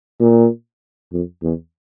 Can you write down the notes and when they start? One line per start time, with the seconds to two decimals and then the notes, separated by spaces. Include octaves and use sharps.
0.20 A#2
1.13 F2
1.43 E2